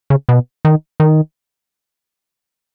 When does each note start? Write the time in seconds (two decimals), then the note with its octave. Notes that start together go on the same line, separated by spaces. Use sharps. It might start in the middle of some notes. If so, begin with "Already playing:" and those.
0.10 C#3
0.29 B2
0.65 D#3
1.00 D#3